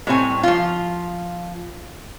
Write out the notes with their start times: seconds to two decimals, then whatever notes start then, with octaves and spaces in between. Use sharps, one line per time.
0.07 A2 G3 C4 C#5 G#5
0.43 F3 F4